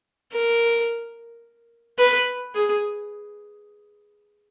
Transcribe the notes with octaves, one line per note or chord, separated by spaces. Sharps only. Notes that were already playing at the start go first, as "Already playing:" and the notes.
A#4
B4
G#4